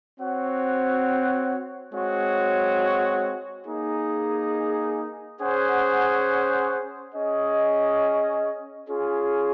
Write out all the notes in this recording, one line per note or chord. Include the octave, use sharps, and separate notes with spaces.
C4 F#4 C#5 F#5
G#3 C4 F#4 C#5
A#3 D#4 G#4
C#4 G#4 C5 F#5
C#4 G#4 D#5
C#4 F4 G#4